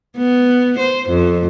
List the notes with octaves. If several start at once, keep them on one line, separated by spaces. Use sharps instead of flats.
B3
C5
F2